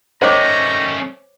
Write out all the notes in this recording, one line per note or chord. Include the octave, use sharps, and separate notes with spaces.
D#3 G3 A3 C#4 C5 C#5 A#5 D6